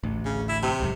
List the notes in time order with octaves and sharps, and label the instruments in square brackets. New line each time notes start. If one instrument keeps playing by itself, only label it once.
[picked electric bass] A1 D2
[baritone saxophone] C#3
E4
C3
[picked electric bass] D1 C#2 F#2